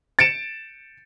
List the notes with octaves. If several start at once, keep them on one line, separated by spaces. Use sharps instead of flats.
A6 C#7 D7 E7